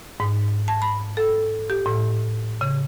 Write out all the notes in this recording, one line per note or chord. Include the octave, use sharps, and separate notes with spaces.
G#2
A5
B5
A4
G4
A2
C#3